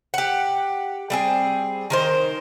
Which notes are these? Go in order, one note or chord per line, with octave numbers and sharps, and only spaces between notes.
G4 F#5
G3 C4 G#4
D#3 A#4 C5